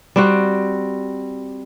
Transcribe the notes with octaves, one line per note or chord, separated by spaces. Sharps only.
G3 C4 F#4